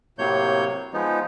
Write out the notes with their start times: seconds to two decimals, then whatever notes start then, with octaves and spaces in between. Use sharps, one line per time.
0.18 A2 C3 F#3 A#3 C#5 G6
0.93 F3 G#3 B3 D#4